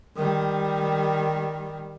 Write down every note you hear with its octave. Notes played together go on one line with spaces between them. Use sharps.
D#3 G3